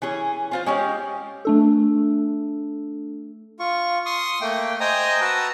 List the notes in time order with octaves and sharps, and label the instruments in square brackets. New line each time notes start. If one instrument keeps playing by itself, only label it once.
[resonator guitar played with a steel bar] E3 C#4 G#4
C4 F4 C5
G#3 C#4 G4
[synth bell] A3 D4 A4
[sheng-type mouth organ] F4 C#6
C6 C#6 D#6
A3 A#3 G5
C5 D#5 G5 G#5 A#5 D#6
F#4 B4 A5 A#5 E6